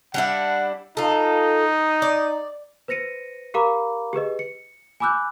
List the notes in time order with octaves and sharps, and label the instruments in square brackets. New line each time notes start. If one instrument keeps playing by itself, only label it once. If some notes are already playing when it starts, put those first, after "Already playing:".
[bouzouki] G3 D4 E4 [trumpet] F#5
[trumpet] D#4 [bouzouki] F4 A4
[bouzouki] D5
[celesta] B4 C5 A#6 C#7 D#7
G4 A#4 F5 A#5 B5 D6
G4 G#4 B4 D#5
C#7
G#5 B5 D6 E6 F#6 G6